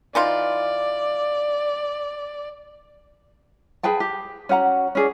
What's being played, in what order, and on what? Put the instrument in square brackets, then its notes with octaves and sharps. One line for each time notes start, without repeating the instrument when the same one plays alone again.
[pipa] E3 D#4 F4 [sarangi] D5
[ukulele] G#4 B4 G5 A5
G4
C#4 F#4 F#5 A#5
C#4 G#4 D5